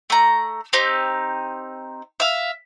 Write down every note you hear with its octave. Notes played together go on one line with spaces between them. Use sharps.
A3 A#5
C4 D#4 G4
E5 F5